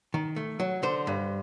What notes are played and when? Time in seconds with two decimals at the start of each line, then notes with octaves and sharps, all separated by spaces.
0.14 D#3
0.36 A3
0.60 F#3
0.83 D3 C5
1.07 G2